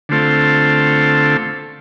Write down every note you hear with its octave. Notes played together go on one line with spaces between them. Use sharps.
D3 A3 C4 F4 A4